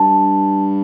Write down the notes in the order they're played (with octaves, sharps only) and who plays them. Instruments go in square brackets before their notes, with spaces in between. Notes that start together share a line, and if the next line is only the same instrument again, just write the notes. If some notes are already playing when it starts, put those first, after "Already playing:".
Already playing: [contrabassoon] G2 [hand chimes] A5